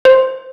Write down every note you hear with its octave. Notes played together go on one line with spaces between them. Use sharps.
C5